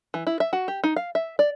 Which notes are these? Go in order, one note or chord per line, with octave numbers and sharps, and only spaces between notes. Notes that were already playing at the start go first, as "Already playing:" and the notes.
E3
E4
E5
F#4
G4
D#4
F5
E5
D5